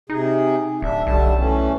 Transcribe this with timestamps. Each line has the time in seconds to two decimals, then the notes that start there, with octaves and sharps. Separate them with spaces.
0.10 C3 D#4 G#4
0.82 D1 D4 E5
1.07 B1 D3 G3 A5
1.36 E3 A3 C#4